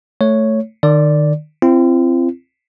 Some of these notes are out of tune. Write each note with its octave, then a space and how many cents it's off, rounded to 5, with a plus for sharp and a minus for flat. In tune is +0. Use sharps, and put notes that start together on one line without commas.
A3 +0 C#5 +0
D#3 -35 D5 -5
C4 +0 F4 -45